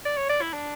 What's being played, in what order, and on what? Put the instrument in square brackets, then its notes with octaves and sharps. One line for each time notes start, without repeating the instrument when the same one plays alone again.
[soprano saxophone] D5
C#5
D5
E4
D4